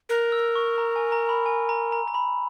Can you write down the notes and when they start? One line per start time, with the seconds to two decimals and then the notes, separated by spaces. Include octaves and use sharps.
0.09 A#4 F#6
0.32 E6
0.55 C#6
0.78 A#5
0.96 G#5
1.12 A#5
1.29 B5
1.46 G#5
1.69 A#5
1.92 A#5
2.08 A#5
2.14 B5